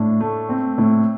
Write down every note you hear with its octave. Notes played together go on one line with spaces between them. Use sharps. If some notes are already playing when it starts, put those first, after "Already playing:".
Already playing: A2 D4
A3
C4
A2